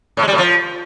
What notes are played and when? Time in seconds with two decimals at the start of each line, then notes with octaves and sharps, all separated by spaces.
0.17 A2
0.22 G#3
0.28 G3
0.33 A2
0.38 F3